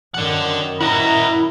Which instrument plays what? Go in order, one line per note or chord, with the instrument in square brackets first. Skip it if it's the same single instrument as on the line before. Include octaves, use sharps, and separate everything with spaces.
[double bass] F#2 D#3 [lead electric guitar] D5 F#5
[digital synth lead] E4 [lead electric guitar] D#5 F#5 [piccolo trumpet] A#5